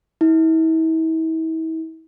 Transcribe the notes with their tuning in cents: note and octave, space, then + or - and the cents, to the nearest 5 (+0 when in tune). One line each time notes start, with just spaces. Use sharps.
E4 -40